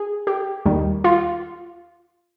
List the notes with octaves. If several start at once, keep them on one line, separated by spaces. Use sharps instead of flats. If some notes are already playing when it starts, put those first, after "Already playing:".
Already playing: G#4
G4
D#2 D#3 G3
F4